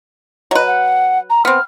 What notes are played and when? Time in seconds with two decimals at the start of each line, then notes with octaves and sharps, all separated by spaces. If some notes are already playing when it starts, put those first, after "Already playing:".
0.51 F#3 B4 D#5
0.67 F#5
1.30 A#5
1.45 B3 C4 F6